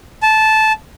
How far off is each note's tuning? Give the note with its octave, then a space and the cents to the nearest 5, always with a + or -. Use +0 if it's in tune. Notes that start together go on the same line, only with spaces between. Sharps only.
A5 -15